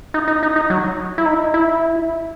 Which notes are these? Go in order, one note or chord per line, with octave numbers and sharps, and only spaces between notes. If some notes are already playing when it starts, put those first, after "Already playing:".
D#4
D#4
D#4
D#4
F#3
E4
D#4
E4